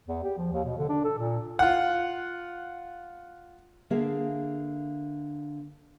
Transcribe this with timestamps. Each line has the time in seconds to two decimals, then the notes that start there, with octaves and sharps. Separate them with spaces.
0.08 E2
0.23 G4
0.38 F3
0.52 D#2
0.65 B2
0.77 D3
0.89 D4
1.04 A4
1.19 A#2
1.59 F4 F#5
3.90 D3 A#3 G#4 E5 F5